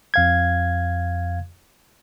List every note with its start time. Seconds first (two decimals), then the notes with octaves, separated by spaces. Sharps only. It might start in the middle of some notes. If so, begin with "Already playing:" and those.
0.14 F2 F5 G#6